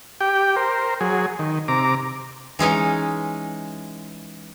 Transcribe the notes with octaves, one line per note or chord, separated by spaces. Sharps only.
G4 G5
A#4 C5
F#3 G#4
D#3
C3 A#5 D6
E3 G#3 C#4 D#4